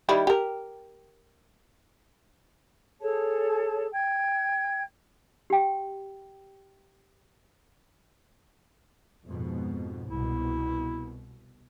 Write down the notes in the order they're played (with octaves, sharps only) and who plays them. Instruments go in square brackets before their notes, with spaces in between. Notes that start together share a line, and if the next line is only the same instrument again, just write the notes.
[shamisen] D#3 G3 E4
G4 A#4
[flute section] G#4 A4 C#5 A5
G5 G#6
[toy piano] G4 G5
[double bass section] F2 G#2 B2
[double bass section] C2 B2 [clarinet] E4